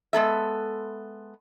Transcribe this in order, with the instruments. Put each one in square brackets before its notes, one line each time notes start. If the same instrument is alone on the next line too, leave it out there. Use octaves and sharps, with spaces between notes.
[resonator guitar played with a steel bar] G#3 B3 A4 E5